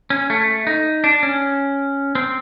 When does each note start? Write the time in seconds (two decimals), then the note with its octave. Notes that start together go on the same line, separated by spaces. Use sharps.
0.10 C#4
0.30 A3
0.67 D#4
1.04 D4
1.23 C#4
2.15 C4